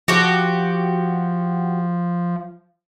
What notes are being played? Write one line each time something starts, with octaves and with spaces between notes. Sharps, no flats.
F3 F#4 G4